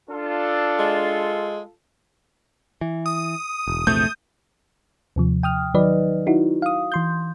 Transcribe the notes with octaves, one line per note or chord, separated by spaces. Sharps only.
D4 F4 A4
G#3
E3
D#6
E1
A#1 E2 C3 A3 G6
D#2 C3 F3
G5 D#6 F6
D#3 F#3 D#4 B4 D5 D#5
D#4 E4 F#4
F5 D#6
E3 C6 G6